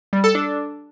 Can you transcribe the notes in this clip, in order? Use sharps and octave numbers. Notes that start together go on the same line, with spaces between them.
G3
A4
D4